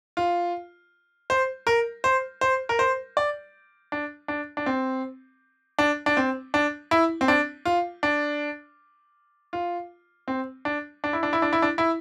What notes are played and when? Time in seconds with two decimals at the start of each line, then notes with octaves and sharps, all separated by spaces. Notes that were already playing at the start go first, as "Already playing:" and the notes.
0.17 F4
1.30 C5
1.67 A#4
2.04 C5
2.41 C5
2.69 A#4
2.79 C5
3.17 D5
3.92 D4
4.28 D4
4.57 D4
4.66 C4
5.79 D4
6.06 D4
6.17 C4
6.54 D4
6.91 E4
7.21 C4
7.28 D4
7.65 F4
8.03 D4
9.53 F4
10.28 C4
10.65 D4
11.04 D4
11.13 E4
11.23 D4
11.33 E4
11.42 D4
11.53 E4
11.62 D4
11.78 E4